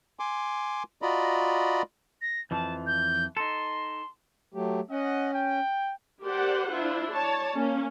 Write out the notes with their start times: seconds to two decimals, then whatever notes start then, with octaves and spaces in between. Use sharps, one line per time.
0.19 G#5 C6 D6
1.02 F4 F#4 D5 D#5 A#5 B5
2.22 A#6
2.51 F2 E3 F3 A5
2.87 G6
3.37 D#4 A4 C6
4.54 F#3 A3 G4
4.90 C#4 D#5 F#5
5.33 G5
6.23 G4 A#4 C5 D5 F#5
6.70 D4 E4 F4 C5
7.12 C#5 D5 A5
7.54 A#3 C#4